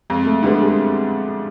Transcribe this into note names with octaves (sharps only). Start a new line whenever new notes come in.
F2 G#3
A3
D3 G3 G#3 B3
G#3